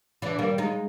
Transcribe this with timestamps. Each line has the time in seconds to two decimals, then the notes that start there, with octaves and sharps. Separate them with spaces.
0.22 E3 D4
0.39 D#3 G3 A#3
0.58 G#3 D#4